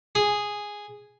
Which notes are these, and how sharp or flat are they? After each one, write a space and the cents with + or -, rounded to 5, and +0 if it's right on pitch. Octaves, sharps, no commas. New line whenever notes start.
G#4 -5